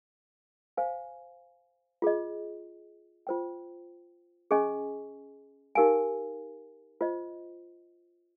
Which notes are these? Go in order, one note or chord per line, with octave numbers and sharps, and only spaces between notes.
C5 F5 G#5
F4 G#4 D#5
F4 C5 G5
C#4 G#4 D#5 G#5 C#6
D#4 G4 A#4 F5 G#5
F4 C5 D#5